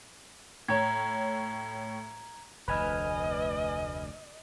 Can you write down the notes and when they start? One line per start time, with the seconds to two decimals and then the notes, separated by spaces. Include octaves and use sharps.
0.68 A2 C#5 A#5 G#6
2.68 F1 D2 B4 D#5 G#5 F6